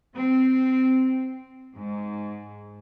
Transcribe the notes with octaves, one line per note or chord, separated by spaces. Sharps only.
C4
G#2